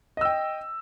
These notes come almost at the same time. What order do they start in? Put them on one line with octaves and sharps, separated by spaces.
D#5 E6 G5